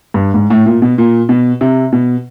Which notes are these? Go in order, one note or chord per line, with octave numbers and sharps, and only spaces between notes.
G2
G#2
A2
A#2
B2
A#2
B2
C3
B2